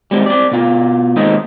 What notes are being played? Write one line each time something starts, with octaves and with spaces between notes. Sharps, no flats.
G3 G#3 C4
C4 D5
B2 F4
D#2 G#2 G#3 C4 D#4 D#5